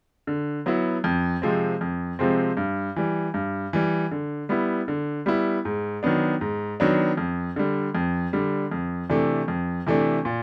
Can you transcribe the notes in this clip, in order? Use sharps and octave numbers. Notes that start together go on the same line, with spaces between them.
D3
F#3 B3 E4
F2
C3 F3 G#3 C4
F2
C3 F3 G#3 C4
G2
E3 G3
G2
E3 G3
D3
G3 B3 E4
D3
G3 B3 E4
G#2
D#3 F#3 B3 D4
G#2
D#3 F#3 B3 D4
F2
D3 G3
F2
D3 G3
F2
C3 E3 A3 D4
F2
C3 E3 A3 D4
A#2